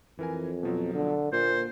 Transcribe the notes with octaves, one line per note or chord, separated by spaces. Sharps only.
F2 E3 A#4 G#5
B2 F3 F#3
D3
A#2 A#3 C5